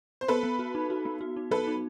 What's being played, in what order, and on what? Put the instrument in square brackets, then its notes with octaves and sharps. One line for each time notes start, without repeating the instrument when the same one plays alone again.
[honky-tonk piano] C5
[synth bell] B3 [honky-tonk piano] A4 B4
[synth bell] B3
F#4
D#4
F#4
B3
F#4
D#4
[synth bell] F#3 [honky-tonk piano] A4 B4
[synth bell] D#4